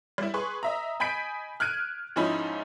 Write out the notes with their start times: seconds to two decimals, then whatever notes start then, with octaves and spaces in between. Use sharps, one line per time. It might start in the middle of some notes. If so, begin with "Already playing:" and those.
0.18 G3 E4
0.34 G#4 B4 C6 C#6
0.63 D#5 E5 A#5
1.00 D#5 G#5 B5 G6 B6 D7
1.60 F6 F#6 G#6 D7 D#7
2.16 G#2 F3 C#4 D#4 E4 B5